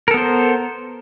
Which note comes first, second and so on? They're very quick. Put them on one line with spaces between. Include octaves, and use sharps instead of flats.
A#4 A4 B3 C5